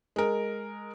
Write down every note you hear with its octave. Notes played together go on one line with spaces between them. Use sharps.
G#3 A#4